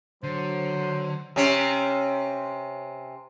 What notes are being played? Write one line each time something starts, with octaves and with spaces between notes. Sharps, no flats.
D3 F#3 C5
C3 C#4